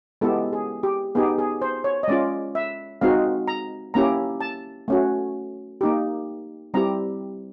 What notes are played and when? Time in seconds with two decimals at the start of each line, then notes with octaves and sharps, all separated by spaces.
0.21 G#3 B3 E4 G4 A4
0.53 G#4
0.83 G4
1.15 B3 D#4 G4 G#4
1.39 G#4
1.62 C5
1.84 C#5
2.03 D#5
2.08 G#3 C#4 F4 D5
2.55 E5
3.01 G#3 C4 D#4 F#4 F5
3.48 A#5
3.94 A#3 C#4 E4 G4 A#5
4.41 A5
4.88 A3 C#4 F#4
5.81 A#3 D#4 G4
6.74 G3 C4 E4 G4 A#5